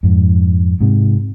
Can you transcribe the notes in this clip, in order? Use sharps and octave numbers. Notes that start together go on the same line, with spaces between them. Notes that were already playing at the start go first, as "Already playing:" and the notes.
F2 G#2
G#2 C3